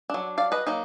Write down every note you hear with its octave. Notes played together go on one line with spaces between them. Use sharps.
F#3 D4
D5 F5
B4 D#5
F#3 A#3 D#4